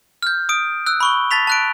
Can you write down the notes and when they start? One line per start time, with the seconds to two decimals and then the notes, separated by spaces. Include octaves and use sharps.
0.23 F6 G6
0.49 D#6 D7
0.86 E6 F#6
1.01 B5 C#6 G7
1.31 A5 A6 B6 F7
1.47 A5 F#6 D7